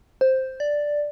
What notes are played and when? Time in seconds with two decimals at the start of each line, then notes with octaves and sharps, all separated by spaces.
0.21 C5
0.60 D5